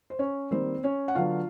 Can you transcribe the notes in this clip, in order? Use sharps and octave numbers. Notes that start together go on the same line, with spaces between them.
C5
C#4 C#5
D#3 G3 A#3 C4 C5
C#4 C#5
F#5
D3 F#3 B3 F4 F5